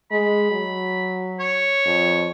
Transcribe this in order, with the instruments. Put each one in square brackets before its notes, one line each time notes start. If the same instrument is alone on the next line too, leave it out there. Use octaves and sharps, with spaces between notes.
[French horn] G#3 [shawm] B5
[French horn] F#3
[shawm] C#5
[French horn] F2